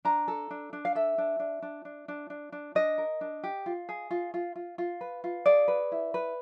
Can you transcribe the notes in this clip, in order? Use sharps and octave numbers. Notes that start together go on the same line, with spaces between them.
D4 A#5
A4
D4
D4
F5
A4 E5
D4
D4
D4
D4
D4
D4
D4
D4 D#5
A#4
D4
G4
F4
G#4
F4
F4
F4
F4
B4
F4
G#4 D5
B4
E4
B4